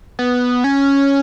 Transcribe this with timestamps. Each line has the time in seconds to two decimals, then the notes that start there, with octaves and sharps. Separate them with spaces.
0.19 B3
0.64 C#4